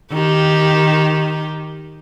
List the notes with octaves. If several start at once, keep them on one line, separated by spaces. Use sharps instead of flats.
D#3 G4